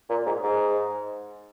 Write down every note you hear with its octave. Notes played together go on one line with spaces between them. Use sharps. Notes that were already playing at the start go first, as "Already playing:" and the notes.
A#2
G#2
G#2